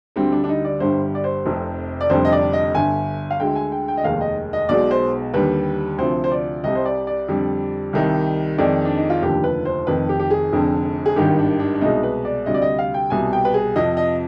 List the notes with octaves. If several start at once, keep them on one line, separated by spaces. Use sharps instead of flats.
D2 D3 G3 C4
D4
D4
D#4
D5
G1 G2 D3 G3 C5
D5
C5
F1 F2 C3
D5
F1 F2 D3 G3 C5
D#5
D5
D#5
G1 G2 D3 G#5
F5
D2 D3 G#3 G5
G#5
G5
G5
D#5
F1 D#2 D#3 G#3 F5
D#5
D#5
B1 B2 G#3 D5
C5
D#2 D3 G3 B4
D2 C3 F3 C5
C5
D5
C2 C3 G3 D#5
C5
D5
D5
F2 D3 G3
C2 C3 D#3 G3
F2 D#3 G#3 D5
D4
D#4
F4
F1 D#2 D3 F3 G4
B4
C5
F1 F2 D#3 B4
G4
G4
G#4
F1 F2 D3
G#4
G#1 G2 D#3 G3 G4
D4
D4
D4
C2 B2 G#3 D#4
B4
D5
D2 C3 G3 D#5
D5
D#5
F5
G5
C2 B2 G3 G#5
G5
B4
G#4
F2 C3 F3 D#5
D#5